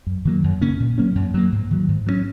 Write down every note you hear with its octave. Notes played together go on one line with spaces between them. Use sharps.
F#2
D#3 F#3 A#3
F#2
C#3 A#3 C#4
A#2
F#3 A#3 C#4
F#2
F#3 A#3
G#2
D#3 F#3
G#2
F#3 A#3 C#4